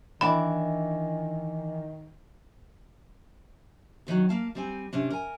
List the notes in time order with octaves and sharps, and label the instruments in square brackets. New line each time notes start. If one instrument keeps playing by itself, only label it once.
[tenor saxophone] D#3 [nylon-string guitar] E3 D4 D5 [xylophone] B5
[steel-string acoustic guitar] D2 D#3 E3 F#3
A#3 F5 A5
G3 C4 G#5
C3 C#4 D4
A#4 G#5